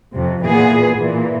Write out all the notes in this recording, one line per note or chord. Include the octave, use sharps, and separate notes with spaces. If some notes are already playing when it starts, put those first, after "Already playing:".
F2 C3
A#2 E3 B3 G#4
A#2 E3